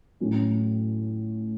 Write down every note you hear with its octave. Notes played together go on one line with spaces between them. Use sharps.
A2 F#3 C#4